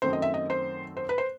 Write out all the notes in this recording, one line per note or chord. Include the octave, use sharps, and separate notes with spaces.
F#2 D#3 A3 C4 C5
D#5
E5
D#5
C5
C5
B4
C5